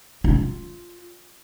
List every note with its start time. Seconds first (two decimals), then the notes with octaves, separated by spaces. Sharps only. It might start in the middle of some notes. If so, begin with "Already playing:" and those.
0.24 F4